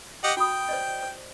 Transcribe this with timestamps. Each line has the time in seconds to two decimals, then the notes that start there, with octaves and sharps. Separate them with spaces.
0.24 G4 D#5 F#5
0.37 F#4 G5 B5 D#6
0.69 C5 D5 D#5
1.03 C5